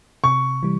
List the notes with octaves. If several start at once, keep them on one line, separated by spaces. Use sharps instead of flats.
C3 C#6
E3 G3